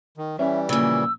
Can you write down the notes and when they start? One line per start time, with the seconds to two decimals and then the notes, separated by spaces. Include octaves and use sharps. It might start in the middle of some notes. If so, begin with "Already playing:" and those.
0.17 D#3
0.39 E3 G3 C#4 E5
0.69 A#2 C#3 F3 A#3 E6